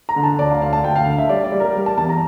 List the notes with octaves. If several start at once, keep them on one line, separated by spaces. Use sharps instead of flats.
A#5
D3
A5
D2 D5
F5
D2 F5
A5
D2 G5
F5
D3
E5
G3 D5
D5
G3
A#4
G3
A5
E2 A5
A#5